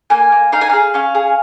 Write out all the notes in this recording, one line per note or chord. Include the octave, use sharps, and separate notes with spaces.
A#3 G#5
A#3
D#4 F5
G#5
G#4 F5
C#4 F5
G#4